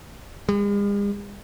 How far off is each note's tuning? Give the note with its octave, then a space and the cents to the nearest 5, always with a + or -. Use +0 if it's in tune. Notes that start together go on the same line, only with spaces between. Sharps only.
G#3 -45